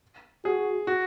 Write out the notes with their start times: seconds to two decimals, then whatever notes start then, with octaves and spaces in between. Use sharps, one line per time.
0.45 F#4 G#4
0.87 F#4